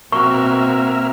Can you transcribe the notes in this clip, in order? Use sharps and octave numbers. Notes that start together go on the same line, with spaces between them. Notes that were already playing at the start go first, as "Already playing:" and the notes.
B2 A#3 C4 F#4 E5 C#6 F6